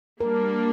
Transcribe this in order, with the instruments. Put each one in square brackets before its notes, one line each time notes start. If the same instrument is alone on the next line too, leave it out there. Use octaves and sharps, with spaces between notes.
[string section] G3 A#3 D4 [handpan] A#4